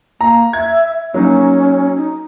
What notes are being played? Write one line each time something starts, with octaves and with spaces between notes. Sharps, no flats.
A#3 A#5
E5 G#6
F#3 A#3 C#4 D#4
D#4